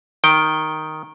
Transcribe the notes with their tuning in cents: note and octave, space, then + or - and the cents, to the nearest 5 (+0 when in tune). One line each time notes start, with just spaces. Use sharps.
D#3 +0 G5 +0